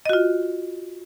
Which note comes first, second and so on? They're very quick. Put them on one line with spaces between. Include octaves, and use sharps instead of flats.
D#5 F#4 F4